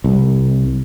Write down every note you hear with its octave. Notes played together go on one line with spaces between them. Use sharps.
C2